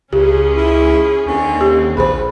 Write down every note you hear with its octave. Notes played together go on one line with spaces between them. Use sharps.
C#2 C#3 C#4 G4 G#4
E4
D#2 D3 C4 C#4
G4
A#1 G#4 B4 C5